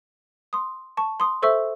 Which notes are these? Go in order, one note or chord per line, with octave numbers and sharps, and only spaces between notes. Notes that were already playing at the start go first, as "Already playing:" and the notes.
C6 D#6
A5 C#6
C6 D#6
A4 C5 E5 C#6 E6